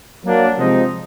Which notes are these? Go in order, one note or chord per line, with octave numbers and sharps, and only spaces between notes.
F#3 A#3 D4
C3 F3 G#3 C4 D#4